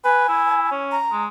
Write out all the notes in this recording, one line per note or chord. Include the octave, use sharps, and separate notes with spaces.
B4 G#5
E4
C#4
A#5
G#3